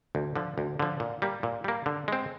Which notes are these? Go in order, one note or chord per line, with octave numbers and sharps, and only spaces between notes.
D2
D3 F3
D2
D3 F3
A#2
G3 A#3
A#2
G3 A#3
D3
G#3 C4